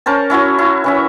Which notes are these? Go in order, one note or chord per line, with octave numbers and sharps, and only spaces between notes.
C#4 A#4 C5 A5
C#4 E4 F#4 C#5
E4
E3 C#4 E5